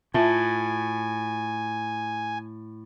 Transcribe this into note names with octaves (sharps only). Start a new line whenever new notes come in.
A2 F4 E5 G#5 A5